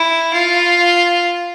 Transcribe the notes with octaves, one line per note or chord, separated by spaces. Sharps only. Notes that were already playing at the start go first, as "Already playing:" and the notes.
Already playing: E4
F4